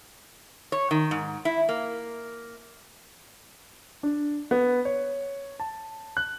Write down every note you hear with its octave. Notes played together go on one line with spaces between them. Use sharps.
C#5
D#3
G#2
E4
A#3
D4
B3
C#5
A5
F#6